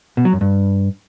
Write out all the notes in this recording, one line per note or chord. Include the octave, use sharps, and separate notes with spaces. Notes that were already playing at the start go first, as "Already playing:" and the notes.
B2
F#3
F#2
G2